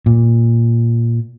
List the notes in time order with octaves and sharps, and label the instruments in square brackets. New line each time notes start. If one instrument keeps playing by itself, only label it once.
[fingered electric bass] A#2